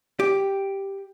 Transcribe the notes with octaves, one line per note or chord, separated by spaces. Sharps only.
G4